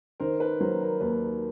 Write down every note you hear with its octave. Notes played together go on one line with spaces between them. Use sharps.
D#3 A#4 C5
B4
F#3 A#4 C5
A#4
D#2 B4